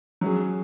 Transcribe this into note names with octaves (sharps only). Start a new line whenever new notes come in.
F#3 C#4 G#4